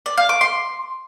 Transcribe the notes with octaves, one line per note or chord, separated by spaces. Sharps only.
D5
F5
D6
C6